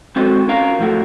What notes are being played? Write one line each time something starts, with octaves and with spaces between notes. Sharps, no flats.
G#3 C4 F#4 A4 C5 D#5
C#4 F4 A#4 F5 A#5
F2 A2 F3 A3 F#4